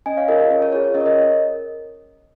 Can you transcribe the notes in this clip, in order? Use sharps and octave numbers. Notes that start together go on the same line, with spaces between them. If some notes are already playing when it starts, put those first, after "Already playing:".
C#4 D#5 G#5
C#5 F5
F4 G#4 A#4 D#5
C#5
C#4 A#4
C#5
F4 G#4 C#5
C#5
C#4 A#4 D#5
C#5
A#4 D#5